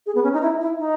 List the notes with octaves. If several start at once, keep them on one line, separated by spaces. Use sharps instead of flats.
G#4
B3
C#4
D#4
E4
E4
D#4